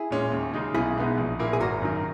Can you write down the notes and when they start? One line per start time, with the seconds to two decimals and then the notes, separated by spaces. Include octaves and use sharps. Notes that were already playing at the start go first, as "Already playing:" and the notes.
Already playing: E4 G#4
0.11 A#2 G#3 C#4
0.32 D#2
0.54 C#3 G#3 D#4
0.74 B1 E4 G#4
0.96 B2 G#3 B3 D#4
1.18 A#1
1.39 A#2 A#3 E4
1.53 G#4
1.60 G#1 F#4 A#4
1.82 F#2 D#3